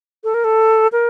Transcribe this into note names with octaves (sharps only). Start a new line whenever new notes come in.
A4
A#4
A4
A#4